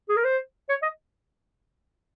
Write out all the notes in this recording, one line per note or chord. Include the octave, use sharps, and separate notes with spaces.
G#4
A#4
C5
C#5
D#5